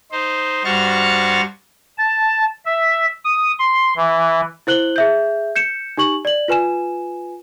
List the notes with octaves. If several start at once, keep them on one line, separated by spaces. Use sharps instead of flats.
D#4 C5
G2 F#4 C5 C#6 F6 A6
A5
E5
D#6
C6
E3
E4 C5 F#6 F#7 G7
G#4 E5 G6
G6 C#7 E7
D#4 G4 C#6 F#7
D5 F#7
F4 B4 G#5 E7